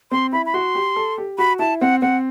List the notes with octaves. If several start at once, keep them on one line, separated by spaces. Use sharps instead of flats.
C4 C6
E4 B5
B5
F#4 C6
G4
A4
G4
F#4 B5
E4 A5
C4 F#5
C4 F#5